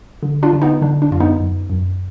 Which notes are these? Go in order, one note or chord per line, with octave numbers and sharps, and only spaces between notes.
D3
D4 F4
D3
B3 D#4
D3 D4
D4
F#2 F4
B3 D#4
F#2
F#2